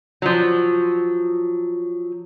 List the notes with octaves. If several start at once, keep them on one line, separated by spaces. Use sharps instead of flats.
F3 F#3